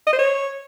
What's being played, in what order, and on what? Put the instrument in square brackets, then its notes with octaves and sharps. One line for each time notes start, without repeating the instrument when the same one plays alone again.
[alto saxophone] D#5
C5
C#5